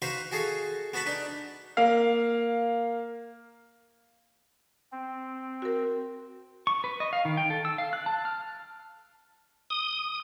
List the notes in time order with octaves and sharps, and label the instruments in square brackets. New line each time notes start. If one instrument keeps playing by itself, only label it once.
[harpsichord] D#4 F#4 B4 C5 D#5 F5
F#4 G#4 A4 D#5 F5
B3 F#4 B4 A5 B5
D4 D#4 B4
[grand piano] A#3 F5
[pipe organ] C4
[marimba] F#4 A#4
[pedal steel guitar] C#6
B4
D#5
F5
D#3
G5
A4
E6
F5
F#6
A5
F6
[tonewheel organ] D#6